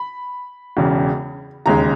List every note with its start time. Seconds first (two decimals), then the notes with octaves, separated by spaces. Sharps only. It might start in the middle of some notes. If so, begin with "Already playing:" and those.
Already playing: B5
0.77 E1 E2 C#3
1.66 E1 D#2 C#3 G#3 A#5